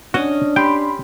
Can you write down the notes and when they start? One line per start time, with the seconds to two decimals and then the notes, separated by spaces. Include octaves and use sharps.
0.14 C#4 D4 F#4 D#5
0.56 G4 G5 B5 C6